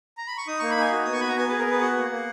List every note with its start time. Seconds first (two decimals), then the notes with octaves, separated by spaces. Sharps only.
0.18 A#5
0.27 B5
0.38 C#6
0.47 D#4 D#6
0.59 A#3 C#6
0.70 B5
0.77 D#4 G#5
0.92 F#4
1.05 B3 D#6
1.13 C#6
1.21 F#4 B5
1.28 A#5
1.36 B3 G#5
1.48 G#4 B4
1.59 A#4
1.67 B3 B4
1.81 F#4 F#5
1.97 A#3
2.11 A#3